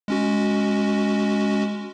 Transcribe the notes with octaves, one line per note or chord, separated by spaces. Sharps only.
G#3 C#4 F#4